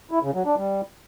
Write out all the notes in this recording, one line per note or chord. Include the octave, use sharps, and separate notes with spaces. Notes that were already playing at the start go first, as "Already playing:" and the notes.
E4
C#3
F#3
D4
G3